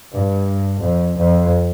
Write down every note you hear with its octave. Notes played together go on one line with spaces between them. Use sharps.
G2
F2
F2